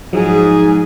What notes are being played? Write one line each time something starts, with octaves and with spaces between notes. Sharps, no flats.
G#2 F3 F#3 G#4